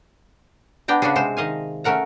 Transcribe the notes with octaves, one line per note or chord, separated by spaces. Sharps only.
B3 D4 G5 A#5
C#3 B3 D4 F#4 G#4
C3 G#3 C4 C5
D#3 D#5 F5 G#5
A3 C#4 A#4 F#5 A#5